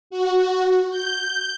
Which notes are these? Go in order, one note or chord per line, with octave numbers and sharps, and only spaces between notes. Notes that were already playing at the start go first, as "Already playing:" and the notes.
F#4
G6